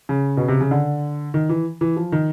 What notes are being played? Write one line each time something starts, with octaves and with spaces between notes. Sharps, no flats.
C#3
B2
C3
C#3
D3
D#3
E3
E3
F3
D#3